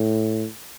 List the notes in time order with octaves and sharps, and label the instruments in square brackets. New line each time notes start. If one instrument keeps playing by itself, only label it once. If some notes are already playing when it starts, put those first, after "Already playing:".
Already playing: [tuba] A2